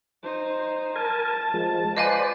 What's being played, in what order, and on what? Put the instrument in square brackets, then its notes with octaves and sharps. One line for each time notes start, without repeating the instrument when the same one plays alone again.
[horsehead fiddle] D#4 C5
[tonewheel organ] A#4 G#5 [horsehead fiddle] A5
[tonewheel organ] F3 G#3
[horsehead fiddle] B4 [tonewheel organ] C5 D5 [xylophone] D#5 F5 G#5